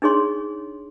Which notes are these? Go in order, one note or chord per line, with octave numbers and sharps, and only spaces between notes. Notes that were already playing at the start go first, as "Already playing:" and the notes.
D4 D#4 G#4 C#5 C6